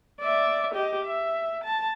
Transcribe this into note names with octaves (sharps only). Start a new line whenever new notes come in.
D5 E5
G4 D#5
E5
A5